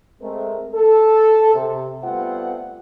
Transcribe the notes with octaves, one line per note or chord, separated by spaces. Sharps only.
G#3 A3 C4 A#4
A4
C3
G3 A3 B3 C4 F4 F#5